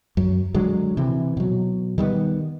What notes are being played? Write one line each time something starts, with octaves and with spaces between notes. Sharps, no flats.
F#2 F#3
D3 F#3 G#3
C3 E3
B2 F#3
D#3 G3 G#3 B3